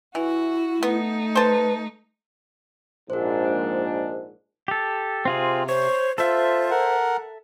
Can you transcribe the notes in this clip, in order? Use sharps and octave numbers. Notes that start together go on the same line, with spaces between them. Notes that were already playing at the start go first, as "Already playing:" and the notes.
E3 E4 F#4
A3 B3 D#4
B4 C5 A5
A#1 G#2 D4 A#4 C5
G4 A4
C3 C4 F4 G#4
C5 C#5
F4 A4 C5 E5
A#4 F#5